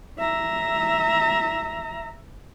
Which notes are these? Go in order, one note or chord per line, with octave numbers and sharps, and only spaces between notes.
E5 A#5